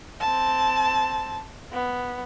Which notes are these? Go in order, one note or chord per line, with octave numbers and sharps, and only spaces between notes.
C4 A5
B3